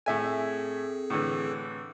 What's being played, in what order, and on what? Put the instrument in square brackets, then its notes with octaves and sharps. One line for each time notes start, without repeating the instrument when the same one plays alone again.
[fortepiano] A2 E5 G#5 [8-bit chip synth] C4 G#4 A4
[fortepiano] A2 D3 E3